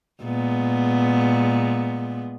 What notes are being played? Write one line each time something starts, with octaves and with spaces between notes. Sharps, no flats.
A#2 G#3 B3